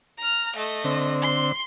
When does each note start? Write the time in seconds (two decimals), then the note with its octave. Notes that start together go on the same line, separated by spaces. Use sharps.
0.18 A#5 F6
0.56 A3 D#5
0.84 D3 C4
1.21 C6